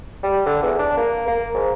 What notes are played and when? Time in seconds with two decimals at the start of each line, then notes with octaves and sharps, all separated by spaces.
0.23 G3
0.46 D3
0.63 E2
0.79 D4
0.97 A#3
1.28 A#3
1.54 G#2